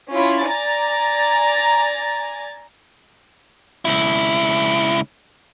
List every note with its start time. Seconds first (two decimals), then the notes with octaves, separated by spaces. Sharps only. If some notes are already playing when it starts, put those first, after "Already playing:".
0.11 C#4 E4 F4 C#5
0.46 D5 G#5 A#5 A6
3.85 C#2 E4